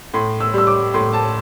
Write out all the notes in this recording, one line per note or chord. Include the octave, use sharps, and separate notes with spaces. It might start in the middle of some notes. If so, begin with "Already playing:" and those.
A2 C6
E6
G3 E6
D6
A2 C6
A5